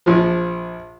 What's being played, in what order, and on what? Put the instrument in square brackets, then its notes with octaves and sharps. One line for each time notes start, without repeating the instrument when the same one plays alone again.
[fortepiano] A#1 F3